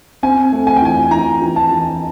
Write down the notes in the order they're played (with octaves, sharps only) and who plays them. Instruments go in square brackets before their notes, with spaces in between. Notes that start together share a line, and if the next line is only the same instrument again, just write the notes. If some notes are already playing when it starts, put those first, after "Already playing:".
[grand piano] C4 G#5
A3
G#5
G5
E3 G#5
E3 A#5
E3
A5
E3